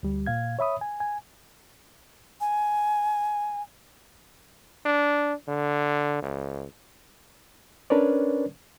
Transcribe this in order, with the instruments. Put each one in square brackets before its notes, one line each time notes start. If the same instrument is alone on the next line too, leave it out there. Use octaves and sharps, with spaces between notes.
[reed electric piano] D2 G3
A#2 F5 G#6
C#5 E5 B5 D#6
G#5
G#5
[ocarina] G#5
[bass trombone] D4
D3
C#2
[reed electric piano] C#4 D4 A#4 B4 C#5 D5